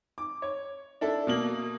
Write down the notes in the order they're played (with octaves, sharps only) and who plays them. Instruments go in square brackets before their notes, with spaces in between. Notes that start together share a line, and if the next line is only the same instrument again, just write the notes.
[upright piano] D6
C#5
D4 E4 A4
B2 A#3 F#7